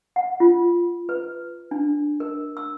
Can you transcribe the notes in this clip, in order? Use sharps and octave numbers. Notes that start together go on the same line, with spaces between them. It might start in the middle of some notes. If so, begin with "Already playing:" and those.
F#5
F4
B4
D4
A#4
E6